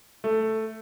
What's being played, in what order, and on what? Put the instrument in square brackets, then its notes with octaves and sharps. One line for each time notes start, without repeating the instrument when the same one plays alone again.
[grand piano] A3